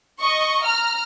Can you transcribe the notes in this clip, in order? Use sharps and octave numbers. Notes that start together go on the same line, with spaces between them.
D#5 C#6
A#5 F6